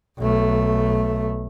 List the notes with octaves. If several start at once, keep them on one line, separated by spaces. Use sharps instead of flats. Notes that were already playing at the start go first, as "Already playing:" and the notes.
B1 A3